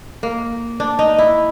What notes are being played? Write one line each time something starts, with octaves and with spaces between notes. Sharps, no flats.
A#3
D4
D#4
E4